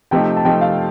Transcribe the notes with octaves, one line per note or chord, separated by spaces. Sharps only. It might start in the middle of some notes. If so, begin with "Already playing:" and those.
C3 F3 A3 D#4 G5
A5
C3 F3 A3 D#4 G5
F5